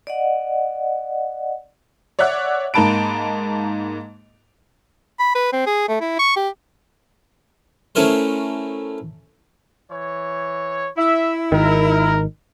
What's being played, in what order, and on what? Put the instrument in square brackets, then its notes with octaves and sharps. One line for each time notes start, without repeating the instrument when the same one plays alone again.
[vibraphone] D5 D#5 F#5
[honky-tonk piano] C#5 D5 E5 F#5 F#6
G#2 A#3 D#4 A5 B5 D7
[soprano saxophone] B5
B4
C4
G#4
A3
E4
C#6
G4
[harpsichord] A3 C#4 E4 A#4 C5
[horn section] E3 C#5
[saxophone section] E4 [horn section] E5
[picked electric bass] G#1 D#3 [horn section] A#4